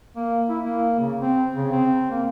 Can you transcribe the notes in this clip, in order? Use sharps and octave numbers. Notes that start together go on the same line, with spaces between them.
A#3
E4
A#3
C#3
C4
C#3
C4
A#3